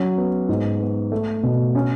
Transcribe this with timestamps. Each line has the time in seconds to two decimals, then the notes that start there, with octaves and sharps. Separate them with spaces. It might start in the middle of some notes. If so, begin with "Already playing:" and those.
Already playing: F#3 C#4
0.18 B3
0.49 G#2
0.80 B3
1.12 A3
1.43 B2
1.75 C#4